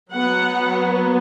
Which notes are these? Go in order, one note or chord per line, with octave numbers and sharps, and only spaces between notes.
F#3 B3 F#5